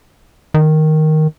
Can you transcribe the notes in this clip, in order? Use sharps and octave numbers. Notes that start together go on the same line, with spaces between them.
D#3